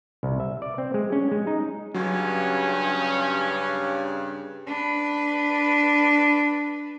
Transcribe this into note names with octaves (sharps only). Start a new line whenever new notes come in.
C2
E5
D5
C4
G#3
C#4
G#3
D#4
G2 C#3 F#3 C#4
D4 B4